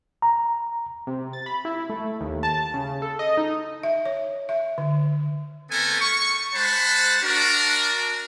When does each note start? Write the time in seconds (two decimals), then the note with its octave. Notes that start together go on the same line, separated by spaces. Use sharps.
0.22 A#5
1.07 C3
1.33 A6
1.46 B5
1.65 E4
1.90 A3
2.21 D#2
2.43 A5
2.74 C#3
3.02 A4
3.19 D#5
3.37 D#4
3.83 E5
4.05 C#5
4.49 E5
4.78 D3
5.71 A3 B3 C4 A4 A#4 G#5
6.01 C#6
6.54 G#3 C5 F#5 A5 B5
7.22 D4 F#4 A#4